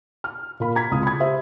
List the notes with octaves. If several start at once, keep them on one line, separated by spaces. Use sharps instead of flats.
F6
A#2 A#3 B5
A#5 G#6 B6
C#2 C3 F4 D#6
B5 G#6
G4 C5 E5